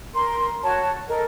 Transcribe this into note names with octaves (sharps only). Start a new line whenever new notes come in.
A#4 C6
F#4 C#5 A5
A4 A#4 D#5